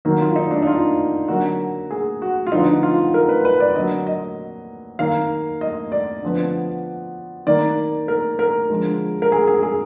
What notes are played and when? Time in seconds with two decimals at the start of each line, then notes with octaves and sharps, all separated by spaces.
0.05 D#3 F#3 A#3
0.21 F4
0.36 D#4
0.51 D4
0.62 D#4
0.67 F4
1.28 D3 F#3 A#3 F#4
1.90 G#4
2.22 F#4
2.47 F4
2.52 D3 F3 B3 D#4
2.83 F4
3.14 A#4
3.29 B4
3.45 B4
3.60 D5
3.76 D3 F#3 A#3 D#5
4.07 D#5
4.99 D#3 A#3 F5
5.61 D#5
5.92 D5
6.23 D3 F3 B3
7.47 D#3 A#3 D5
8.08 A#4
8.39 A#4
8.70 D3 F3 G#3
9.22 A#4
9.32 G#4
9.47 G#4
9.63 G#4